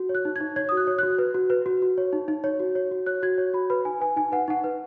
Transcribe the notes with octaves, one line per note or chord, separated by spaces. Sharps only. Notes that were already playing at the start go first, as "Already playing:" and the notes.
Already playing: F#4
C#5
F#6
D#4
D#4 G#6
C#5 G#6
F#4 D#6
F#6
C#5
F#4 F#6
B4
F#4
B4
F#4
F#4
C#5
D#4
D#4
C#5
F#4
C#5
F#4
C#5 F#6
F#4 G#6
C#5
F#4 B5
B4 B5
D#4 G#5
B4 G#5
D#4 G#5
B4 F#5
D#4 F#5
B4